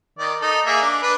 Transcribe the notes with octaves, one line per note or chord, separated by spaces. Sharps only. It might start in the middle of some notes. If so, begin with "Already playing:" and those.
D#3 D5
D#4 A4
A#3 G#4 E5
D4
D4 B4